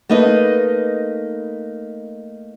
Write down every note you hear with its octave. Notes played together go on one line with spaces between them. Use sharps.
A3 A#3 D#4 B4 D#5